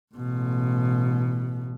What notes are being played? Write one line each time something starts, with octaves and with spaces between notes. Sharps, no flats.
A1 B2